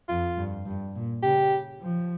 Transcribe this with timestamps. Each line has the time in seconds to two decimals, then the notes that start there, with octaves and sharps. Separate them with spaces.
0.09 F2 F4
0.37 G2
0.66 G2
0.95 A#2
1.23 C#3 G4
1.81 F3